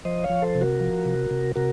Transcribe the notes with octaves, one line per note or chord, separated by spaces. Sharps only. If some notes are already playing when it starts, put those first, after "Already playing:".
F3 C5 D#5
C#5 F5
F3
A4 C5
C3
F#4 A#4
F3
C3
C3
C3 F#4 A#4